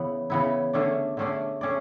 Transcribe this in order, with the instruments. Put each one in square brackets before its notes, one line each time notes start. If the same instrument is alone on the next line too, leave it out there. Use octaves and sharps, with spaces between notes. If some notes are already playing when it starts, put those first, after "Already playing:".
Already playing: [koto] C#3 E3 B3 E4
C#3 E3 B3 E4
D3 A3 C#4 G#4 D5
D3 A3 C#4 G#4 D5
A3 C#4 G#4 D5